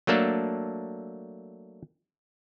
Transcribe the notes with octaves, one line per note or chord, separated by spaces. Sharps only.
F#3 A3 A#3 D4 A4